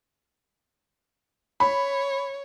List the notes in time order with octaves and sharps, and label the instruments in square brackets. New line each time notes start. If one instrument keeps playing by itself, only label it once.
[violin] C#5 [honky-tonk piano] B5